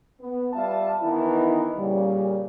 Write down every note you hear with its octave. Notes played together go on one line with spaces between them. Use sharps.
B3
G3 F4 E5 A5
D#3 E3 B3 D#4 E4
A#2 C#3 G3